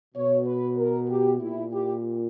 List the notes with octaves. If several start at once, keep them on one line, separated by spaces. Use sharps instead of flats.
B2 C#5
B4
A#4
G4
A#2 E4
G4